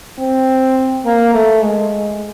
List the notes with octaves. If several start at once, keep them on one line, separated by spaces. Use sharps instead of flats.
C4
A#3
A3
G#3